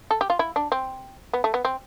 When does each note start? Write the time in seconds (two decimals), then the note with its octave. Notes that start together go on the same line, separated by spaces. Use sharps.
0.11 A4
0.21 G4
0.30 F4
0.39 E4
0.56 D4
0.72 C4
1.33 B3
1.44 A3
1.54 B3
1.65 C4